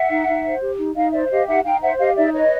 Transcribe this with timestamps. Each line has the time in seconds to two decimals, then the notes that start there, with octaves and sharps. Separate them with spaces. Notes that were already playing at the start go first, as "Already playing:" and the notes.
Already playing: E5 F#5
0.09 D#4
0.27 D#4
0.44 C5
0.61 G4
0.78 D#4
0.95 D#4 D#5 F5
1.13 C5 D5 E5
1.25 E5
1.30 G4 D#5 F5
1.47 D#4 E5 F#5
1.65 D#4 F5 G5
1.82 C5 E5 F#5
1.99 G4 D#5 F5
2.16 D#4 D5 E5
2.34 B4 C#5 D#5